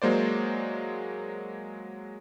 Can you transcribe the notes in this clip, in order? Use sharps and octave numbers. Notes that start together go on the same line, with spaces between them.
F#3 G#3 A#3 C5 D5